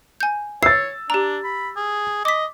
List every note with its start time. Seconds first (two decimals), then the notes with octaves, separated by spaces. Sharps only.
0.20 G#5 G6
0.63 C#5 E6 A6 C7
1.10 D4 G4 A#5
1.44 B5
1.77 G#4
2.25 D#5 D6 B6